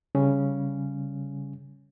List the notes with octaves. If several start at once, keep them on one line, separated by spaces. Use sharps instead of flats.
C#3 G3 C#4